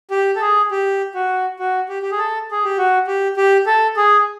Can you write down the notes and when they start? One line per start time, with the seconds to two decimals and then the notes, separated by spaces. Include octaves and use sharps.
0.11 G4
0.36 A4
0.41 G#4
0.71 G4
1.15 F#4
1.59 F#4
1.89 G4
2.03 G4
2.11 G#4
2.18 A4
2.51 G#4
2.64 G4
2.78 F#4
3.07 G4
3.37 G4
3.66 A4
3.97 G#4